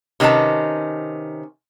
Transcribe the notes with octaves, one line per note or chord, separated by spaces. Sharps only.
C3 D#3 C#4 B4 A5